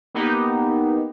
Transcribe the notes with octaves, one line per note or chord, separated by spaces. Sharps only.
A#3 B3 D#4 G4